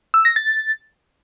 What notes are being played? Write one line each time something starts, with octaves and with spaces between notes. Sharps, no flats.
E6
A#6
A6